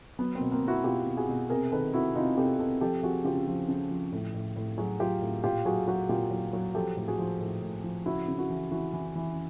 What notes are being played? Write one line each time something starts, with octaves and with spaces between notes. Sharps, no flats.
F#3 B3
A#3 C4
B2
A#3 C4
B2
E4 F#4
B2 F4 G4
B2
F#4 G#4
B2
C3 G#4 A#4
D#3 A4 B4
C3 E4 F#4
C3 D#4 F4
C3 G4 A4
C3 G4 A4
F3 G4 A4
F3 F#4 G#4
C#3 F4 G4
F3
C#3
F3
A2
A2
A2
F#3 F#4 G#4
F#3 F4 G4
A2
A#2 F4 G4
F#3 F#4 G#4
F#3 F#4 G#4
A#2 F4 G4
F#3
F#3
F3 G4 A4
A2
F#4 G#4
F3
A2
A2
F3
C#3 E4 F#4
C#3
E4 F#4
E3
E3 E4 F#4
E3
E3